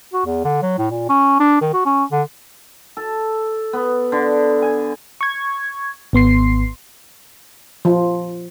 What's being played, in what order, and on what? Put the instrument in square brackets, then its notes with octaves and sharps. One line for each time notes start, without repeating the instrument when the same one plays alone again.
[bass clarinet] F#4
E2
D3
F#3
A2
A#2
C#4
D4
D#3
F#4
C#4
D3
[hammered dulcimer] A4
B3
D3
G#5
[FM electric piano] C#6 G#6
G#1 B3 C6 C7
[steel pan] F3